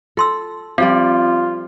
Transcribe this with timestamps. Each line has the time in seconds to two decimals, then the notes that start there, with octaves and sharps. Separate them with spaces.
0.17 F4 A4 C6 E6
0.78 F3 G3 C4 C#4 F4 D5 F5